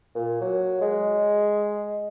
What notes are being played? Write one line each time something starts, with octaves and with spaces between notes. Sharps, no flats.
A#2
F#3
G#3